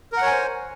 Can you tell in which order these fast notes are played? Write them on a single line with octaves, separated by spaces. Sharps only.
A#4 F#5 C#5 G#5 C5